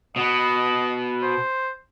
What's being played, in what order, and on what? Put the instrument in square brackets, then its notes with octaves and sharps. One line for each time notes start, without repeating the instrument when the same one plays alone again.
[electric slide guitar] B2 B3 [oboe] D#5
[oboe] C5